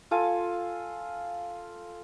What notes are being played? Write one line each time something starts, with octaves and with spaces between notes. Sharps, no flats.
F4 A4 F5 G#5